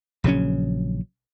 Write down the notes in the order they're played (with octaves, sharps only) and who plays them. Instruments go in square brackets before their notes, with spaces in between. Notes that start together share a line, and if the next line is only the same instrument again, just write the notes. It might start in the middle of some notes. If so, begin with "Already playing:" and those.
[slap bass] A#1 C#3 F#3 C#4